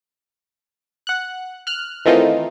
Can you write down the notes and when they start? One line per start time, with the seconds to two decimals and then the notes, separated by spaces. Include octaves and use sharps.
1.07 F#5 F#6
1.67 F6 F#6
2.05 D#3 E3 A3 C4 D#4 F4